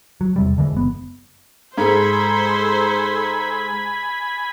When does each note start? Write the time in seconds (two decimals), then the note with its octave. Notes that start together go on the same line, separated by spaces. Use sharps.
0.21 F#3
0.36 E2 C3 G3
0.58 D3 E3 G#3
0.73 F#1 B3
1.78 G#2 A4 C5 G#5 B5